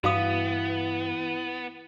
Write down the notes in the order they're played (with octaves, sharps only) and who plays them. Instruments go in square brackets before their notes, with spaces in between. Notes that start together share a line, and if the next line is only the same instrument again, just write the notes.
[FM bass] G2 [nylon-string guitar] E3 [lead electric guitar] B3 [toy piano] F#4 F5 D#6